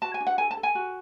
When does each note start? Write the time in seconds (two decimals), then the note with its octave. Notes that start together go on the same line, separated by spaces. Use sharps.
0.02 F#4 A5
0.14 G#5
0.20 D4
0.27 F#5
0.38 A4 G#5
0.51 A5
0.57 A4
0.63 G#5
0.75 F#4